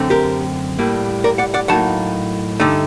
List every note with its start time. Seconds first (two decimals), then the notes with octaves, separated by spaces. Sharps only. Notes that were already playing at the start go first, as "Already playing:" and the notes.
Already playing: F#2 D3 A3 C4
0.10 G4 A#4
0.79 A2 G3 A#3
1.24 A#4 D5
1.38 D5 F#5
1.54 D5 F#5
1.68 A2 F#3 A#3 D#4 F#5 A5
2.60 G2 D3 A3 D#4